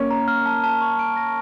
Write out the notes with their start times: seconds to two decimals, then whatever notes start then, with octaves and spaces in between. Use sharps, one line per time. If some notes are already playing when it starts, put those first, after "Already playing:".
Already playing: A#3 C#4
0.11 A#5
0.28 F6
0.46 A5
0.64 A5
0.81 C#6
0.99 D7
1.17 A#6